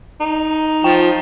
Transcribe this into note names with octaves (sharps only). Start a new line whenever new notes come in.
D#4
F3 G5